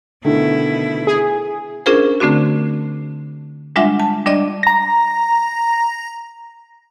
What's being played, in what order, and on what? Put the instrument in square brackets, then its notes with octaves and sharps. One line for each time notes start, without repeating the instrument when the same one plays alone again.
[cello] B2 E4 [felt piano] D3 D#3 A3
[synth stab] G#4
[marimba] C#4 D4 F4 G#4 A#4 C5
D3 A3 C4 D4 F#4
G3 G#3 D4 F4 E5 F#5
A5
G3 D4 D5 D#5 D6
[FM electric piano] A#5 A#6